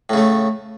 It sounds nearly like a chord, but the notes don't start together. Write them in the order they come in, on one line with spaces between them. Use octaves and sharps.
A2 C#3 A3